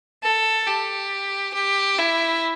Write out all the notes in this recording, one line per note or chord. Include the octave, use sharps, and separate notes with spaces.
A4
G4
G4
E4